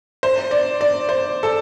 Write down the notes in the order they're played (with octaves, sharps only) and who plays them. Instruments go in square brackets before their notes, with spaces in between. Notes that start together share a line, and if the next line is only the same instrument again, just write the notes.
[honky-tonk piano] C5
D5
D5
C5
A4